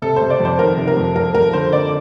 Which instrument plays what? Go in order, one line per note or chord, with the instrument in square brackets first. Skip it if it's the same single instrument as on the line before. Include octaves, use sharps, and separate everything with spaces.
[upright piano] C3 A4
C5
C3
D5
F2
C5
D#3 A#4
C3
A#4
F2
F2 A#4
F2 A#4
D3 C5
D3 D5